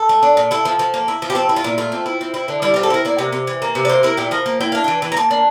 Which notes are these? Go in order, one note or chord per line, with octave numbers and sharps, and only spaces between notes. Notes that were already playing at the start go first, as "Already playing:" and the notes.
Already playing: A4
A3
D4
A#2
E4 A4
F3
F3
A#3
E4
F3
G4
C4 A4
E4
F4
A#2
A3 F4
C4
E4
C4
E4
D3
G3 E4
C4 F4
A4
E4 A#4
A#3 D5
C3
C3
E3
A#3
C3
D5
A#3 C5
E4 A#4
A#2 G4
F3 A#4
A#3
E4 G5
D4 F5
E3 G5
E3
A#5
A#3 A5
D4